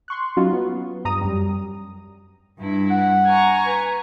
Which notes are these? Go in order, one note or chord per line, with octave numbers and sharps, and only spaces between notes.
C6 C#6 F#6
F#3 C#4 D#4 F4 F#4
B3
G2 A#5 D#6
F#2 G3
G2 E4
F#5
G#5 A#5 C#6
B4